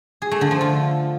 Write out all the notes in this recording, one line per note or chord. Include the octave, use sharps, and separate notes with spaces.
G#4
A3
D3
F3
F4